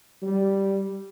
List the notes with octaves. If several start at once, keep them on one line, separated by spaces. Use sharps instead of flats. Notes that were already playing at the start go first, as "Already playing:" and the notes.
G3